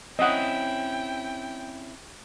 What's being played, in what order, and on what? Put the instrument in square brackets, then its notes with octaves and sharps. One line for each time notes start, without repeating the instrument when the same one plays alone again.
[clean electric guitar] C4 C#4 E4 [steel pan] D#5 F#5 [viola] G5